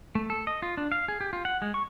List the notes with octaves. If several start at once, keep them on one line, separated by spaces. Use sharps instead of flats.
A3
A4
D#5
F4
D4
F5
G#4
G4
F4
F#5
G#3
C#6